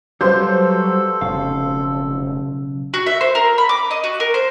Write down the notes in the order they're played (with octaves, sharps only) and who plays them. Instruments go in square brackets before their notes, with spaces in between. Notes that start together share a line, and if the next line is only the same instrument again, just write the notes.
[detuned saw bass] F#3 [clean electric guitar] G3 B4 F5 [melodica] A4 [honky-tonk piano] C5 C6 G6
[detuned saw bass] F1 [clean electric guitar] B1 C#3 F5
[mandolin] F#4
E5
C5
A#4
B5
D6
D#5
F#4
A#4
C5